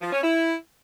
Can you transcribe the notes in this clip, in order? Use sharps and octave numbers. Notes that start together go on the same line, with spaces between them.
F3
C#4
E4